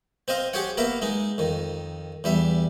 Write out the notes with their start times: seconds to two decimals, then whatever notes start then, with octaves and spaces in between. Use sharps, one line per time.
0.28 C4 C5 D#5 F5
0.53 G4 G#4 C5 C#5 F#5
0.77 A#3 B3 A#4 E5 A#5
1.02 G#3 D#4
1.38 F2 D#3
2.24 E2 G3 E5